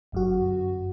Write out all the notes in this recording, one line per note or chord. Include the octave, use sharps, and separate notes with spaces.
G1 F#2 F#4